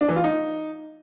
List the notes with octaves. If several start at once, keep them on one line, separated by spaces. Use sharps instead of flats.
D4
E3
F4
D#4